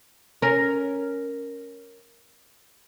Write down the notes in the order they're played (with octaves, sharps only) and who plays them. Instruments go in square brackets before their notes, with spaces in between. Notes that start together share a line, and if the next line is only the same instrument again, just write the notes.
[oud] C#4 A#4